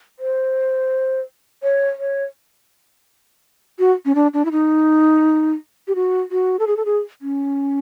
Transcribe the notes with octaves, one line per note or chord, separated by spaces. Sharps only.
C5
C#5
C#5
F#4
C#4
D4
D4
E4
D#4
G4
F#4
F#4
A4
G#4
A4
G#4
C#4